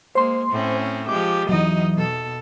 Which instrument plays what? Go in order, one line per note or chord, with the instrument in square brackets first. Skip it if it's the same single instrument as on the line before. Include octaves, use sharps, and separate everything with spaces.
[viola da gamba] G#3 A#3 [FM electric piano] C5 C6
[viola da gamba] A2 C4 C#4
[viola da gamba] F3 G#3 G4 [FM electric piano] D6
[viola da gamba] E2 D#4 D#5 [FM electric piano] E3 F#3
[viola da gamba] B2 A4